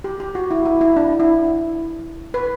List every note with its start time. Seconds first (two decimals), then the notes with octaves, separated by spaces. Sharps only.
0.04 G4
0.20 G4
0.35 F#4
0.51 E4
0.66 E4
0.81 E4
0.96 D4
1.20 E4
2.34 B4